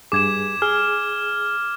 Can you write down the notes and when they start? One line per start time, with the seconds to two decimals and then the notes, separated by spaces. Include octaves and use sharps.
0.12 G2 G#4 D6 G#6 E7
0.62 G#4 F6